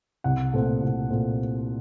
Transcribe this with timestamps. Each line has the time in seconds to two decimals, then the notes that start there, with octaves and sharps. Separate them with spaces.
0.24 C2 F#5
0.53 A#2 A3 C4
0.81 C2
1.10 A#2 A3 C4